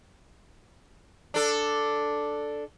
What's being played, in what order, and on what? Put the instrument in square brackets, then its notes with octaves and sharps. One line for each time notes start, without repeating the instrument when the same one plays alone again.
[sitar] D4 A4